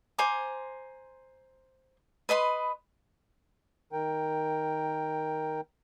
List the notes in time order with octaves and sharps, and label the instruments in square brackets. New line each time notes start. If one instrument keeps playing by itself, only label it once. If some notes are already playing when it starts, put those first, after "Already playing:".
[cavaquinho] C5 G#5 A#5 D6
B4 D#5 B5 C6
[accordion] D#3 A#4 G5